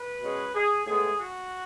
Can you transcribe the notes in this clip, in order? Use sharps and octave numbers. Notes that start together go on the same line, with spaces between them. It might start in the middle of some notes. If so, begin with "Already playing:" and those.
Already playing: B4
B2 G#3 C#4
G#4
A2 G#3 B3 G#4
F#4